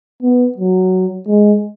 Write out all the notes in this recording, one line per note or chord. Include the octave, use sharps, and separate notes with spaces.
B3
F#3
G#3